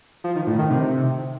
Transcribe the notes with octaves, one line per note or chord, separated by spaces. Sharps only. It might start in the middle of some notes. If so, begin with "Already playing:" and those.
F3
D#3
A2
D#3
C3